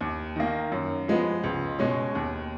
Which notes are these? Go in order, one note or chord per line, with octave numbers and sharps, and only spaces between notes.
D#2
D#3 A#3
F#2
F3 G#3 B3
C#2
B2 G#3 C#4
D#2